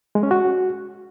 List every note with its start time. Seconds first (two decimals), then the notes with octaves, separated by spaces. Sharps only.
0.15 G#3
0.23 C#4
0.31 F#4